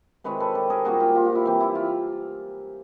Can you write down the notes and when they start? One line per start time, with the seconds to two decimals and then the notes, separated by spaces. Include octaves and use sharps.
0.24 C3 D#3 G#3 B4 C#5
0.40 A4 B4
0.55 G4 A4
0.70 G#4 A#4
0.85 A#2 G3 C4 D#4 F#4 G#4
1.00 F4 G4
1.15 F4 G4
1.25 F4
1.35 E4
1.45 E3 G3 C4
1.60 E4
1.75 F4